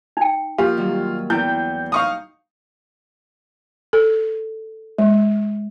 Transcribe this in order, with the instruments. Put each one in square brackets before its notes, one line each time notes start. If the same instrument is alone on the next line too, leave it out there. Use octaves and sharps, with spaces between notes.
[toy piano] D#4 G5
[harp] A#2 F3 [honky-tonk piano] F4 [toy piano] G4 F5
[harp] D#3 F#3 G3
[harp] E2 G5 [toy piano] E4 [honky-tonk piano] G6
[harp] D#4 [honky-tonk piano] F5 C#6 D#6
[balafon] A4
G#3